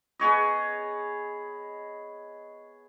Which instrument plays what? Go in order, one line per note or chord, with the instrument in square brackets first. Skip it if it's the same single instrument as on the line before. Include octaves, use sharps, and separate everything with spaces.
[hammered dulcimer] B3 G#4 C#5 D#5